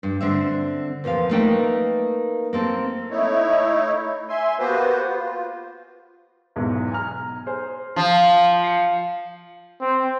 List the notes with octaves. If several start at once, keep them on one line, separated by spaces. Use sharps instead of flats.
G2
D3 C4 E5
E2 A#2 F3 F5
A3 A#3 D#4 A#4 B4 G5
A#3 C4 A4
A3 D#4 E4 C#5
E5 G#5 C6
A#3 B3 F#4 G4 B4 C5
F4
B1 E2 G#2
G#5 A#5 F6
G#4 C5
F3
F5
C7 C#7
C4